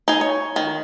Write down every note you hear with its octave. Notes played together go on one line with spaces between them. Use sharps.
D#4 G#4
C#5
D#3